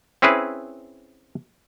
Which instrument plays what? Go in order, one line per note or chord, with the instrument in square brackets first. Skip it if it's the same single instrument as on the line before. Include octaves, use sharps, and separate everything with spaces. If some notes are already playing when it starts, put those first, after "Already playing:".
[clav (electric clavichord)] C4 C#4 E4 G#4 B4